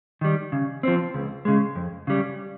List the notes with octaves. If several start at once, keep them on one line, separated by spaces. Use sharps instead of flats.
D#3 G3
C#3
F3 C4
C#2
C#3 G#3
F2
C#3 G3